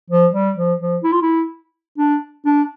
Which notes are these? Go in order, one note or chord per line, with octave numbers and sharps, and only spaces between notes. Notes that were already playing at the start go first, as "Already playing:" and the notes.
F3
G3
F3
F3
E4
F4
E4
D4
D4